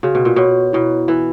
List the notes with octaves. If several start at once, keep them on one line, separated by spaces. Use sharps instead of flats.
C#3 F#4
B2
A#2
B2 C#5
B2 E4
E3 B4